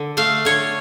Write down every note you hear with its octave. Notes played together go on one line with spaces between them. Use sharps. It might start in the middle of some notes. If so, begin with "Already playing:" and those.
Already playing: D3
A3 F5
D3 C#5